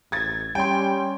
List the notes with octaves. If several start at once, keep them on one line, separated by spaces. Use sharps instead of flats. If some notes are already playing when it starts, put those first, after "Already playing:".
A1 G#6 A6
G3 C#4 G5 C6